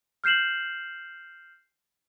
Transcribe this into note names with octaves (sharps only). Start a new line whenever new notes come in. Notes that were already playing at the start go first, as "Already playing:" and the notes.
F6 G6 C7 E7 F#7